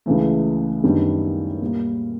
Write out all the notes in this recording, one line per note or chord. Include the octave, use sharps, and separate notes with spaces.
C#2 C#3 E3 A3
F#2 D#3 G3 B3 D4
A#2 G3 A#3